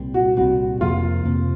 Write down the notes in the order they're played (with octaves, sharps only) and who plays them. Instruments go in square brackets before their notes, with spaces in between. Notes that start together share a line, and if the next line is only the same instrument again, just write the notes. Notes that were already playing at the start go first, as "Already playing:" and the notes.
Already playing: [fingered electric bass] C2 A#2 G3 C4
[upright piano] F#4
[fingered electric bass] C2 A#2 G3 C4 [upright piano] F#4
[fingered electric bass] F2 C3 F3 A#3 [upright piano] F4
[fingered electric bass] F2 C3 F3 A#3